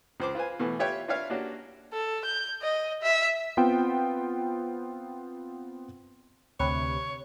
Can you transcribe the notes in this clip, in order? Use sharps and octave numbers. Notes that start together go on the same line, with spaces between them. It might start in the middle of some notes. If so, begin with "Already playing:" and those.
C#2 C5 D6
F4 B4 C5 G#5
B2 E3 A3
F4 G4 B4 C#5 E5 G5
D4 F4 B4 C#5 E5 F5
A#3 C#4 D4 F#4 G4
A4
G6
D#5
E5
B3 C4 F4 G5
D2 C3 B4 C#5